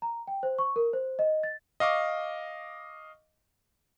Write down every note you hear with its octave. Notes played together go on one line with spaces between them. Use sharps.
A#5
G5
C5
C#6
A#4
C5
D#5
A6
D#5 F5 C#6 D6